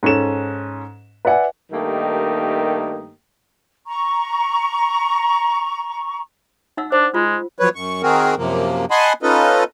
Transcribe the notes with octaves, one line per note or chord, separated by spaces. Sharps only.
G#2 C#4 A4 E7
B4 D5 E5 F#5 G#5
G2 D#3 A3 A#3 D#4 G4
A#5 C#6
D#4 F#5 E6
D4 C5
G#3 F4
F3 F#3 B4 C#5
F#2 C#6
D#3 C4 F#4 G#4 A#4
F#2 C3 F3 A#3
D#5 F#5 G#5 A5 B5 C6
C#4 D#4 F4 A4 B4 D#5